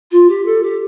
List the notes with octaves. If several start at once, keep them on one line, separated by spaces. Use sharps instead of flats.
F4
G4
A4
G4